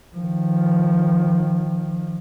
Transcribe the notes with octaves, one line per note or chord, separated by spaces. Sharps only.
D#3 F3